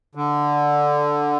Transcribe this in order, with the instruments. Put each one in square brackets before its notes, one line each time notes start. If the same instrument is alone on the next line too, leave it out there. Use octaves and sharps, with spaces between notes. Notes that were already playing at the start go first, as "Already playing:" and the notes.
[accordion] D3